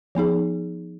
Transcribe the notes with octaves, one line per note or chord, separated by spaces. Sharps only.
F3 B3 D#4 G#4